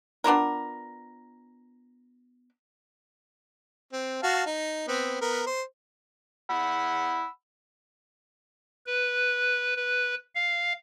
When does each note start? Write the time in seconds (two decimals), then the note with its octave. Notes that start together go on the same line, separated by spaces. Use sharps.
0.24 B3 D4 F4 A#4
3.93 C4
4.23 F#4 F5 A5
4.46 D#4
4.88 B3 C4
5.21 B3 A#4
5.47 C5
6.50 F#5 B5 E6
8.87 B4
9.76 B4
10.35 F5